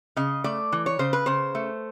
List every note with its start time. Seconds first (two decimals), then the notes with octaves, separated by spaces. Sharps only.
0.17 C#3 D#5
0.44 A3 D5
0.72 E3
0.86 C#5
0.99 C#3 C5
1.13 B4
1.26 C#3 C5
1.55 A3